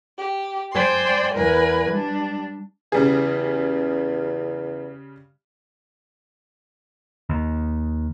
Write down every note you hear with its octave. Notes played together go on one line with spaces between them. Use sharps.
G4
C5 D5 G5 G#5 C6
E2 A#4 B4 G#5
G3 D4
E2 C#3 G3 G#4
D#2